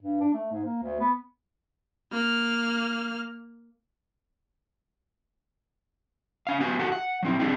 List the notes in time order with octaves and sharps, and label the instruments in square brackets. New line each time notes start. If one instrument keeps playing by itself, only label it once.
[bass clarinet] G2
D4
A3
G#2
A#3
D2
B3
[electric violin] A#3 F6
[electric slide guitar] C#4 F5
F#3 B3 G4 G#5
F#4 G4 A4 F#5
F#5
F#3 C4 E4
G3 C4 D4 D#4 G4 G#4